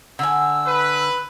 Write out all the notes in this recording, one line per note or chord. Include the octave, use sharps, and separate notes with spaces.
D3 G#5 E6
B4